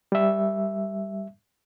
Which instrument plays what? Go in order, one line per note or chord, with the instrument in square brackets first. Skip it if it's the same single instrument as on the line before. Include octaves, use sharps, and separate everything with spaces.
[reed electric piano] G3 E5